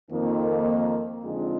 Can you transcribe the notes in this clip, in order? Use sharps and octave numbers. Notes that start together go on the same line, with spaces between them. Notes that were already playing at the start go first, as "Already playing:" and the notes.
F2 D#3 A#3
F2 D3 G#3 C4 D#4 F4